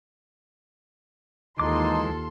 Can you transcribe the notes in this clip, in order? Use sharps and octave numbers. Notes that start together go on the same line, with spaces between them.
D#2 E3 G#3 D#4 F4 A4 C6 D6